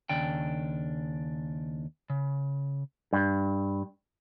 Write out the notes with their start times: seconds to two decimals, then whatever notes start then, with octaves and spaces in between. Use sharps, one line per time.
0.09 D#2 C#3 D4 G5
2.10 C#3
3.13 G2